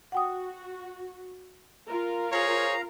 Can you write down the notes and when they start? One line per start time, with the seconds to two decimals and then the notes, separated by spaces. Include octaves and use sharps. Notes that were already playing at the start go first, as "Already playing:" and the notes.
0.12 F#4 F#5 G5 D#6
1.88 F4 A#4
2.32 G#4 C5 C#5 F5 A#5